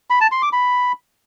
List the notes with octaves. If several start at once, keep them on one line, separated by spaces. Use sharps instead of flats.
B5
A5
C6
D6
B5